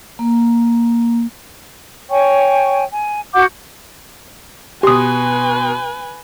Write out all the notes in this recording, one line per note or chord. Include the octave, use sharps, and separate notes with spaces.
A#3
C#5 G5 G#5 C#6
G#5
F#4 F#5 D6 G6
B2 G4 B4 G#5 C6 D#6